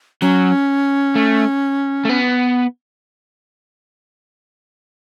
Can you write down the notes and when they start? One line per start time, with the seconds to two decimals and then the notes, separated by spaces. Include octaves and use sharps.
0.22 F#3 C#4
1.15 A3
2.05 A3
2.09 B3